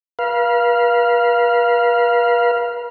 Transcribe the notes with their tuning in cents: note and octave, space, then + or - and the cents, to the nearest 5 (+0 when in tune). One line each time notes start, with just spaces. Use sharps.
B4 -45 F5 -10